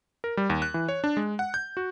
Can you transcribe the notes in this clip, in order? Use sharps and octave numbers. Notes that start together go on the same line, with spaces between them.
A#4
G3
D#2
F#6
E3
C#5
D4
G#3
F#5
G6
F#4